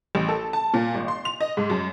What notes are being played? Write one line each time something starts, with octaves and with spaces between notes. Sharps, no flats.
A1
A4
A5
A#2
G#1
C6
F7
D#5
G#2
F#2